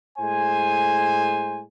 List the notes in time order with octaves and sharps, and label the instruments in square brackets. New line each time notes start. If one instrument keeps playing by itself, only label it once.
[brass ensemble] A2 G#3 C5 G#5